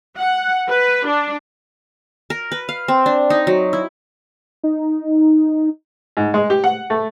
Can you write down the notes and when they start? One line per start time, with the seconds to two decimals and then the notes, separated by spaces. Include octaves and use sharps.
0.19 F#5
0.69 B4
1.07 D4
2.30 A#4
2.52 B4
2.69 F5
2.88 C4
3.06 D4
3.30 D#4
3.47 F#3
3.73 E4
4.63 D#4
6.17 G#2
6.34 G#3
6.50 G4
6.64 F#5
6.90 A3